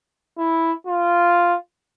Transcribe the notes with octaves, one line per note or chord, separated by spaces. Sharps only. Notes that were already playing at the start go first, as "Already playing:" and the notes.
E4
F4